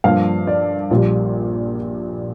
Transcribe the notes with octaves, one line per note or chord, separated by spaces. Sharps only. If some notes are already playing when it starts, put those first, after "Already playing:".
G2 F3 A#3 F5
D5
A#1 A#2 G3